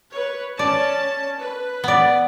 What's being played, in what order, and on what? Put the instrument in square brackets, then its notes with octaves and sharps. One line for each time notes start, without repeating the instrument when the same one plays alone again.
[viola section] B4 C#5
[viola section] C#4 A5 [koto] D5
[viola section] B4
[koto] B3 D5